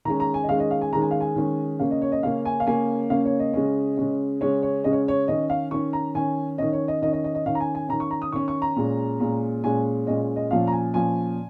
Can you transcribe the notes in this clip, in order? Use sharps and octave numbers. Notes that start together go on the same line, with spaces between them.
D#3 G#3 C#4 A#5
A#5
G#5
D#5
D#3 G#3 C#4 F5
D#5
F5
G#5
D#3 G#3 C#4 A#5
G#5
F5
G#5
D#3 G#3 C#4
C#3 A#3 C#4 F5
D#5
C#5
D#5
C#3 A#3 C#4 F5
G#5
F5
C#3 A#3 C#4 G#5
C#3 A#3 C#4 F5
C#5
D#5
C#3 G#3 C#4
C#3 G#3 C#4
C#3 G#3 C#4 C#5
C#5
C#3 G#3 C#4 D#5
C#5
C#5
D#3 C#4 D#5
F5
D#3 C#4 C#6
A#5
D#3 C#4 G#5
D#3 C#4 D#5
C#5
D#5
D#3 C#4 D#5
D#5
D#5
D#5
D#3 C#4 F5
A#5
G#5
G#5
D#3 C#4 A#5
C#6
A#5
D#6
D#3 C#4 C#6
C#6
A#5
A#2 G#3 C#4
A#2 G#3 C#4
A#2 G#3 C#4 G#5
A#2 G#3 C#4 D#5
D#5
A#2 F3 C#4 F5
A#5
G#5
A#2 F3 C#4 G#5